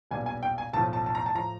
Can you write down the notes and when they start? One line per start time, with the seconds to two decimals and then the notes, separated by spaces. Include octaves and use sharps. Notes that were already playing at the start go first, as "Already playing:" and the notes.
0.11 B1 A#2 G3 B3 D4 G#5
0.26 G#5
0.43 G5
0.58 G#5
0.73 B1 A2 F3 A5
0.93 A5
1.06 A5
1.15 A#5
1.26 A5
1.34 A2 F3 A#5